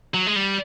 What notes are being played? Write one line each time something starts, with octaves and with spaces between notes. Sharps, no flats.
F#3
G#3
G3